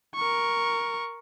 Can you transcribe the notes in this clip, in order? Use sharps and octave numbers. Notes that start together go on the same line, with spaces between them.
A#4 C#6